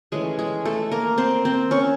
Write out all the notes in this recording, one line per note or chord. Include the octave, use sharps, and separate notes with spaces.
E3 G#3 A3 C#4 G#4
G#3 G#4
A3 A4
A#3 A#4
C4 C5
C4 C5
C#4 C#5